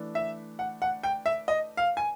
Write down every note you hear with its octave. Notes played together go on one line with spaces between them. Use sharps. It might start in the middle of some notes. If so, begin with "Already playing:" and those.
Already playing: E3 A3 D4
E5
F#5
F#5
G5
E5
D#5
F5
G#5